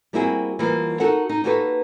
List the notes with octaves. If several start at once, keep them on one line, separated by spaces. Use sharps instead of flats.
G3 A#3 C4 E4 F#4 G#4
E3 F3 G3 A#3 F#4
D#4 F#4 A4 A#4 F#5
D#4
A#3 D#4 F#4 G4 A4 B4